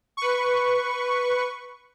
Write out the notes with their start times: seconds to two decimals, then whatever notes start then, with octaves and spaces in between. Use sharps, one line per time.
0.17 B4 C#6